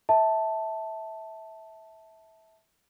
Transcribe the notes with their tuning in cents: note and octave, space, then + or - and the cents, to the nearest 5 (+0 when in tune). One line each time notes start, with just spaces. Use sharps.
E5 -20 A5 +0